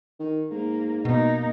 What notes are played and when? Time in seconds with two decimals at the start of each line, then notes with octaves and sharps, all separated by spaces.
0.20 D#3
0.51 G#2 A#3
1.05 B2 A#3 D#4